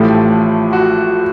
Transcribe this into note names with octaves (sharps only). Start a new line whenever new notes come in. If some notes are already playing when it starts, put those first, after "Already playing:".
Already playing: A1 A2 F3 A3 G4
F#4